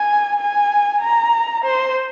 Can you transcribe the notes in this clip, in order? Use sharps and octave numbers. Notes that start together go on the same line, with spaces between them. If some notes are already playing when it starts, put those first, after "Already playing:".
Already playing: G#5
G#5
A#5
C5